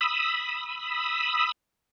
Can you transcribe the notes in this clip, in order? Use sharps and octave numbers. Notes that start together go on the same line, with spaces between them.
B5 D#6 E6